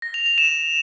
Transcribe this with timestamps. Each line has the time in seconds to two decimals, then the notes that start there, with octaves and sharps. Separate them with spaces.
0.02 A#6
0.14 F7
0.26 F7
0.38 E7